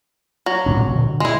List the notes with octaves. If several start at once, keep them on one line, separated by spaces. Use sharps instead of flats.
F#3
G2 A#2 D4
A#2
D3
G#3 E4